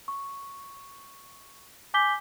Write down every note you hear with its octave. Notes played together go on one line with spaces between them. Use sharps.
C#6
G#5 D6 G6 B6 G7